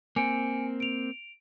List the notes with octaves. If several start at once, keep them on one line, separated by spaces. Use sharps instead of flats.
A#3 C4 G#5 C#7 D7
D7 F7